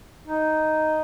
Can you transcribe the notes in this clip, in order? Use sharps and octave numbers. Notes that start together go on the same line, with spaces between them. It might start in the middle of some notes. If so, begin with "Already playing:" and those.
D#4